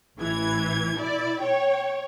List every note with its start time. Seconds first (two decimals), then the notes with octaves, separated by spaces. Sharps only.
0.18 A1 E3 G#6
0.97 B2 E4 D5
1.41 C#5 G5